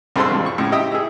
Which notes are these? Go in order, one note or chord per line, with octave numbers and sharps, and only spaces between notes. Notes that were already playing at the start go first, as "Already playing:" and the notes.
C2 G2 G#4 A4 C5 C6
A1 F2
C#6
A2 C#3
G4 D#5 E5 G5 D#6
E4 G#4